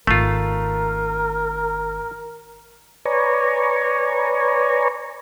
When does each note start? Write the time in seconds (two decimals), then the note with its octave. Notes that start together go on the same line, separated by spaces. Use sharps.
0.07 G#1 A3 F4 A#4
3.05 B4 C#5 D5 G#5 A#5 C#6